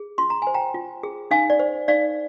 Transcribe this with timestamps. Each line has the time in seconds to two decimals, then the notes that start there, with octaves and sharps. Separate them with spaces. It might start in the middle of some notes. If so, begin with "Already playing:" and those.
Already playing: G#4
0.18 F4 C6
0.30 A#5
0.42 C5 G#5
0.54 G5 A#5
0.74 F4
1.03 G#4
1.31 D#4 F5 G#5
1.50 D5
1.59 C5
1.88 D#4 D5 F5